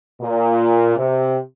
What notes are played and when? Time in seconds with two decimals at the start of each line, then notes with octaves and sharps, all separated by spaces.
0.22 A#2
0.97 C3